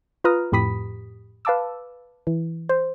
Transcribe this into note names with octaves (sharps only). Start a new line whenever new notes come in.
F4 B4 A#5 D#6 F6
F2 A2 G4 B5 D#6 B6
B4 F5 A5 D6 E6
E3
C5